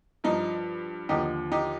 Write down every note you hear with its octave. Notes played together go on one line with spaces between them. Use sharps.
G2 F3 D#4
D#2 D3 F3 D#4 G4
D#4 G4